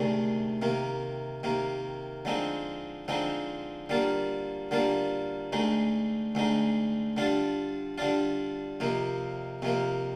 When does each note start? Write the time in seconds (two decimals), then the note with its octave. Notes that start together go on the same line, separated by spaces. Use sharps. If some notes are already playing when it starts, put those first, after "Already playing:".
Already playing: D2 C3 D#3 G#3 D4
0.62 C3 D#3 A#3
1.43 C3 D#3 A#3
2.25 D3 F3 G#3 C4 D#4
3.08 D3 F3 G#3 C4 D#4
3.89 D3 G3 A#3 F4
4.71 D3 G3 A#3 F4
5.52 D2 D3 G#3 D#4
6.35 D2 D3 G#3 D#4
7.17 D3 G3 D4 F4
7.98 D3 G3 D4 F4
8.80 F2 C3 F3 A#3
9.62 F2 C3 F3 A#3